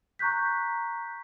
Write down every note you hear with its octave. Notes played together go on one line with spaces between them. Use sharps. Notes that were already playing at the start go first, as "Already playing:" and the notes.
A#5 C#6 F#6 G6 B6